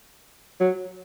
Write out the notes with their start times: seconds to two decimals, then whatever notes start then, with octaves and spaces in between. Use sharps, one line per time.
0.60 F#3